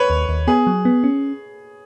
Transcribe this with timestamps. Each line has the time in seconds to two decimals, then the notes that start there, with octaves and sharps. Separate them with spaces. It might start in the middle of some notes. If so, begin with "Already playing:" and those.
Already playing: B4 C#5
0.10 D#2
0.29 D#2
0.47 B3 G#4
0.67 F#3
0.85 B3
1.04 C#4